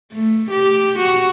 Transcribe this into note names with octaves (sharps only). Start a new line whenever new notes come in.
A3
G4
F#4